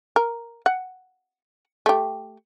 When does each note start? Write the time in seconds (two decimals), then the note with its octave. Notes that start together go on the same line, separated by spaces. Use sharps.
0.16 A#4
0.66 F#5
1.86 A3 G4